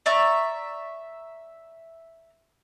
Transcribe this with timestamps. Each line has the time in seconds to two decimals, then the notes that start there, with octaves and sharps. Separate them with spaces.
0.06 D5 E5 A#5 C#6